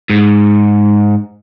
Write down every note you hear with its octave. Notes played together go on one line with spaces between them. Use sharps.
G#2